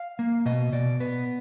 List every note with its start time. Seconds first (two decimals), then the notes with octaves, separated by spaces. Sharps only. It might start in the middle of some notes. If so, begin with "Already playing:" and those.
Already playing: F5
0.19 A#3
0.46 B2 D#5
0.72 B2 D5
1.00 B3 B4